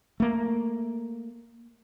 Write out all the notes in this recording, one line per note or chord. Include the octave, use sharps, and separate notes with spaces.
A3 A#3